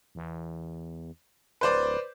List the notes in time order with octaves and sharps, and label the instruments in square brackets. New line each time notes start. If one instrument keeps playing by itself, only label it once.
[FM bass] E2
[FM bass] D1 [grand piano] B4 C5 D5